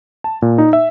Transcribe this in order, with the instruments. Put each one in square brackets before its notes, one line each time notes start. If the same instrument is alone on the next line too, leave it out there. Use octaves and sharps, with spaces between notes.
[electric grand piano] A5
A#2
D#4
E5